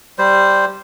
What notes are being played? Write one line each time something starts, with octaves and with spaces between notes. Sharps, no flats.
G3 C5